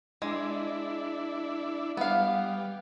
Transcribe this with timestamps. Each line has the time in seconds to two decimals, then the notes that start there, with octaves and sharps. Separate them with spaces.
0.22 G#3 D4 E4
1.97 G3 B3 F5